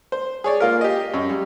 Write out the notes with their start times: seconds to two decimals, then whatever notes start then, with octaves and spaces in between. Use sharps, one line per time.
0.12 C5
0.44 G#4 C#5 D5
0.60 A#3 F4 A#4
0.81 G4 D#5
1.14 F#2
1.29 G3